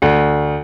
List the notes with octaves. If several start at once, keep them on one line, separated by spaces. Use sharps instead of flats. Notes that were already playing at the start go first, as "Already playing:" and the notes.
D2